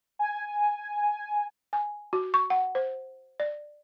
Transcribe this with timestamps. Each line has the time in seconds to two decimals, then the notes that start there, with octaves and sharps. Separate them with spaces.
0.19 G#5
1.73 G#5
2.13 F#4
2.34 C#6
2.50 F#5
2.75 C5
3.40 D5